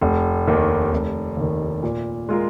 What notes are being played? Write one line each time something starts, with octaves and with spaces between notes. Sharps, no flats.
F1
D#2 D#3
F1
D#2 D#3
A#2
G#3 F4 A#4